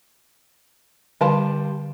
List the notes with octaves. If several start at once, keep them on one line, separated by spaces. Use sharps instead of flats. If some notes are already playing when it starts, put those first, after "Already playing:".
D3 G3 B4 F5 A5 C6